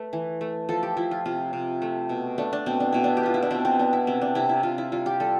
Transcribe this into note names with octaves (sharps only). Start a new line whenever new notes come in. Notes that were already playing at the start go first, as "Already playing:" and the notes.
Already playing: A3 B4
E3
A3
F3 A4
G4
F3 E4
F4
C3 F4
C3
A3
B2
A3 D4
D4
B2 C4
D4
B2 E4
D4
G4
B3 F4
E4
D4
B2 C4
C4
B3 D4
E4
C3 C4
D4
C3 E4
E4
C3 F4
E4
G3 F4
G4
G3 A4